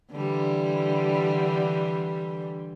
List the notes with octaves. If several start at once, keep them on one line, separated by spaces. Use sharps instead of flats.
D3 E3 G3